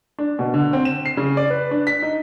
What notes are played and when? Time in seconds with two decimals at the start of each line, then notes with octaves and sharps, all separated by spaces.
0.19 D4
0.39 B2
0.54 D3
0.73 C4
0.85 E7
1.06 C7
1.17 C#3
1.37 D5
1.50 B4
1.71 D4
1.87 B6
2.02 D#4